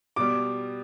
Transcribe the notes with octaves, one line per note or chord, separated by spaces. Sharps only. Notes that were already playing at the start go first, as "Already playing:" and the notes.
B2 G3 D6